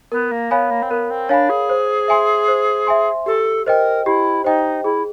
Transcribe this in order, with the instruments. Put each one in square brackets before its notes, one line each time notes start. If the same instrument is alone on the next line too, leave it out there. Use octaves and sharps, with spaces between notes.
[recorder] B3 [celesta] A#4
[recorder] A#3
[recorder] B3 [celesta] C#5 F5 G#5 B5
[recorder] A#3
C4
[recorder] B3 [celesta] A#4
[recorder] C4
[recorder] D4 [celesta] C#5 F5 G#5 B5
[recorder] G#4
[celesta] C5
E5 G#5 C6
C5
E5 G#5 C6
[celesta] G4 [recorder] A4
[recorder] A#4 [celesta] C5 D#5 G5
[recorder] E4 [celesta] G4
[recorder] D#4 [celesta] C5 D#5 G5
[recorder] E4 [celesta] G#4